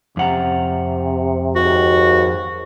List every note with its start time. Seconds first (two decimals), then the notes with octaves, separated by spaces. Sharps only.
0.17 F2 C3 F#5 A#5
1.56 D#2 G#2 F#4